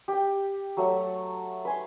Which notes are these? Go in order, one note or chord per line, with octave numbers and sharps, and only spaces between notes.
G4 G5
F#3 A3 F#5
B4 G#5 C6